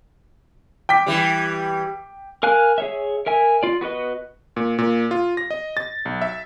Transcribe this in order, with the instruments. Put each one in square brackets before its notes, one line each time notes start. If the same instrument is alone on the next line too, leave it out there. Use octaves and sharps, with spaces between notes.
[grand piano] G5 D6 B6
[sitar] E3 G3
[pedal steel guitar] A#4 F5 G#5 F#6
G#4 C#5 E5
A#4 E5 G#5
F4 D5
B3 F#4 B4 D#5
[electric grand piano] A#2
A#2
F4
A#6
D#5
A6
B1
E5